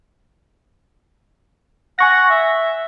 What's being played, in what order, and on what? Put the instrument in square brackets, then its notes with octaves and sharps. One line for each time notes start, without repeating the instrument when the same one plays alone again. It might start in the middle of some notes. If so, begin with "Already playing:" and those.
[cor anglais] F#5 [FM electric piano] G#5 C#6 A#6
[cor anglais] E5